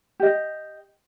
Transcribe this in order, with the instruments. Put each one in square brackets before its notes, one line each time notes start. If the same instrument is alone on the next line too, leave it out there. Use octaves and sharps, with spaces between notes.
[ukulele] G4 D#5